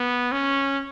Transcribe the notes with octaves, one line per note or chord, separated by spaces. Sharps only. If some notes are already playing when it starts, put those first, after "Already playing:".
Already playing: B3
C#4